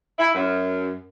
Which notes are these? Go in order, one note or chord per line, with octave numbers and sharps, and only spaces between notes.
E4
F#2